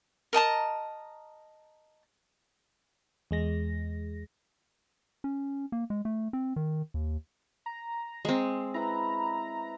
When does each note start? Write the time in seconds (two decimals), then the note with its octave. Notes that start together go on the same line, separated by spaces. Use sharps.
0.33 A#4 D#5 A5 A#5
3.31 E2 G#3 A#6
5.24 C#4
5.72 A#3
5.90 G#3
6.05 A3
6.33 C4
6.56 D#3
6.94 D#2
7.66 A#5
8.25 G#3 C4
8.74 E4 B4 A#5